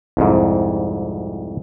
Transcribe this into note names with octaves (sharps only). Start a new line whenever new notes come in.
C2 F2 G#2